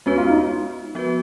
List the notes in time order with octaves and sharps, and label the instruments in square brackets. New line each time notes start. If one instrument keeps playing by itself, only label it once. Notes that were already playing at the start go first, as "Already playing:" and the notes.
[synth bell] G#3 B3 F#4 B4 [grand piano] C#4
[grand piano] F4
D#4
[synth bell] F3 B3 F#4 B4